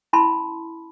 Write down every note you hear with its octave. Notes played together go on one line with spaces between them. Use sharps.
C#4 E4 A5 B5 C6